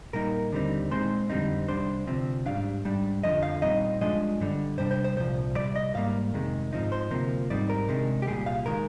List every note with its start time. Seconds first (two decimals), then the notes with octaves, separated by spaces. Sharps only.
0.13 A#2 G3 A#3 D#4 A#4
0.52 D#2 D3 G3 C4 D#4
0.90 A#2 G#3 C4 D#4 C5
1.30 F2 D3 G3 C4 D#4
1.68 C2 A#2 G3 D4 C5
2.07 D2 C3 F3 C4
2.46 G#2 G3 D4 F5
2.85 G#2 G3 D4
3.23 F2 D3 F3 D#5
3.43 F5
3.62 A#2 G3 C4 D#4 D#5
4.01 G2 F3 G#3 D4 D#5
4.40 G2 D3 G3
4.78 C3 G3 D4 C5
4.91 C5
5.04 C5
5.17 C2 A#2 F3 C5
5.55 C2 C3 G3 D5
5.76 D#5
5.94 G#2 G3 A#3 F5
6.34 F2 C3 D#3 G#3
6.73 G#2 F3 C4 D#4
6.92 C5
7.11 D2 C3 F3 A#3
7.50 G#2 G3 C4 D#4 D5
7.70 A#4
7.89 C3 D#3 G#3 D4
8.22 G4
8.27 C2 A#2 G3 G#4
8.46 F5
8.66 D#3 G#3 A#4